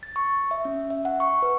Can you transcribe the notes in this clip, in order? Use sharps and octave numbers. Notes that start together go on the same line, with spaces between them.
A6
C#6
E5
C#4
E5
F#5
C#6
B4